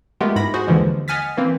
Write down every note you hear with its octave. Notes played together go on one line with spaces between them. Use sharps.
G#3 A3 B3 F4 G4 A#4
G#2 E4 B5 A#6
F#4 G#4 C5 F#5
D#2 D3 E3 F3 G#3
D#5 F#5 G#5 F6 A6 B6
E3 A#3 C4